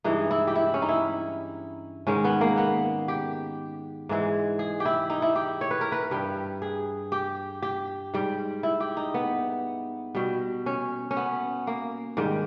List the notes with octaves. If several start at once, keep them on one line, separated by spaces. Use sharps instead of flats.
G2 E3 G#3 D#4
E4
G4
E4
C#4
D#4
E4
G#2 D#3 G#3 C#4
B3
A#3
B3
G4
G#2 E3 G#3
G#4
G4
E4
D#4
E4
G4
C#5
B4
A#4
B4
G2 G3
G#4
G4
G4
G#2 G3
E4
G4
D#4
B3
B2 G3
C#4
C#4
B3
A#3
G#2 D#3 G3